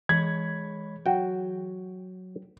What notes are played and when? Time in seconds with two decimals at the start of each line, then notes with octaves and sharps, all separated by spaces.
0.09 E3 G#3 G#4 C#5 B5 G#6
1.06 F#3 F#4 G5